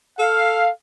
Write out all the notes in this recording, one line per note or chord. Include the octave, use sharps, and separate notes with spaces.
A4 F5